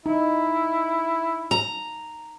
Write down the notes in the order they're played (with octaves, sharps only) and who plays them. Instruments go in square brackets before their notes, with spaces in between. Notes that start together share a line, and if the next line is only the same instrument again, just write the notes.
[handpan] D#4 [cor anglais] E4
[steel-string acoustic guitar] A#5